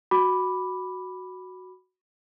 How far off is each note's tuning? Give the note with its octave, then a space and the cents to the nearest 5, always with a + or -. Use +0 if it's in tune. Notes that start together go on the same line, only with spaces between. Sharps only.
F#4 +0 B5 +0 D6 +0